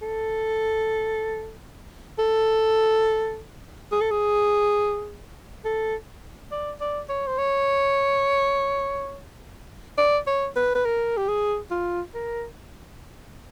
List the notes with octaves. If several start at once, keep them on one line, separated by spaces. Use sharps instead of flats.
A4
A4
G#4
A4
G#4
A4
D5
D5
C#5
C5
C#5
D5
C#5
B4
B4
A#4
G4
G#4
F4
A#4